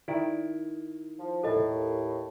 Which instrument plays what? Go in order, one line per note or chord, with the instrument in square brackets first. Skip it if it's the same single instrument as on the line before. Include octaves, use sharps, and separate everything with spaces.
[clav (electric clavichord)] D#3 E4 D5
[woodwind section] F3
[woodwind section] D#2 A2 [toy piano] A4 D#5